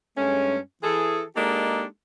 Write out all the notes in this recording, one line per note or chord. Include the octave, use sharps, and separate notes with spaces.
G2 G#3 A3 C#4
E3 G#4 A4
G#3 A#3 D4 D#4 G4 A4